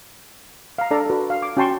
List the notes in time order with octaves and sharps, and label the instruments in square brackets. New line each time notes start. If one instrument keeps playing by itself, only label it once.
[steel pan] F5 A#5
D4 A4 D5 A#5
F#4 B4
F5
D6
C#4 F#4 G5 A5 C6 C#6